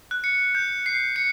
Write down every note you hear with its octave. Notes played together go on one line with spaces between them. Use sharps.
F#6
C#7
G6
C7
C#7